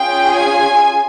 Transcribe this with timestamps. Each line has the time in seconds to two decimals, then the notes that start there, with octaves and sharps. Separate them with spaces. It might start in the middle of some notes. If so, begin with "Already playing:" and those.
Already playing: C#4 F4 G#4 G5
0.35 G#5